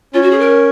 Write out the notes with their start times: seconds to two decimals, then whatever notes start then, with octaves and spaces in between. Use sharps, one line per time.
0.14 C#4 F4
0.22 F#4
0.31 G#4
0.40 A#4